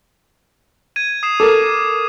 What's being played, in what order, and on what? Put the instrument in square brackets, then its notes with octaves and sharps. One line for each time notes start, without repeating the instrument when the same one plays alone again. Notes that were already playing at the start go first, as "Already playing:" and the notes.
[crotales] G#6 D#7
D#6 C7 E7
[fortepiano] A4 A#4 [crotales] D6